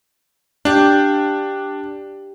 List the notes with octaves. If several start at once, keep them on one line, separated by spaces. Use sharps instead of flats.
D4 G4 F5